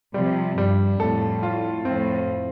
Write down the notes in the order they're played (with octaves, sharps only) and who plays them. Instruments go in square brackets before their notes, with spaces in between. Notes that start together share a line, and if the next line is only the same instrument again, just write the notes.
[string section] C3 F3 [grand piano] G3
[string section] G2 [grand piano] G3
[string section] F2 A2 [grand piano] A4
[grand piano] F4
[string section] F2 A2 [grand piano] C4